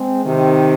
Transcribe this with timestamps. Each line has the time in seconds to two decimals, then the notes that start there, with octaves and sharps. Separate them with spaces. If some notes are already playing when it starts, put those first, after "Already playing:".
Already playing: G#3 C4
0.25 C3 D#3